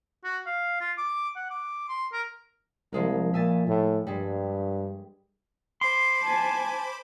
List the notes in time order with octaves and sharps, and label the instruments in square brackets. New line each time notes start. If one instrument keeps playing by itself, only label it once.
[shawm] F#4
F5
F4
D6
F#5
D6
C6
A#4
[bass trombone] C2 [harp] F3 G#3 A#3
[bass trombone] A#2 [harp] E5 G#5 A6
[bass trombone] A2
[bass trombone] G2 [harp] G3 G#3
[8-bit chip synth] C5 B5 D6 [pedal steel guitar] C6
[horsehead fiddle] G#5 A5